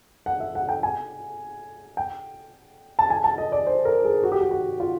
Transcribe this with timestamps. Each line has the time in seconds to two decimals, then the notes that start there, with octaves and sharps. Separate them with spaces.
0.26 F#5
0.40 E5
0.55 F#5
0.69 G5
0.83 G#5
1.97 G5
2.99 A5
3.10 G#5
3.24 A5
3.38 D#5
3.52 D5
3.67 C5
3.85 A#4
4.05 G#4
4.23 F#4
4.32 G4
4.41 F#4
4.51 F#4
4.80 F4